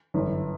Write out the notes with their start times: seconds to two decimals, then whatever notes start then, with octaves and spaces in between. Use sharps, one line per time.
0.14 G1 F#2 E3